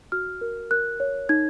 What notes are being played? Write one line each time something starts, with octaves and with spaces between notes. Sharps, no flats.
F#4 F6
A#4
A#4 F#6
C#5
D#4 G#6